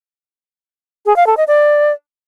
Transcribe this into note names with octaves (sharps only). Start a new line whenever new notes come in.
G#4
F5
A4
D#5
D5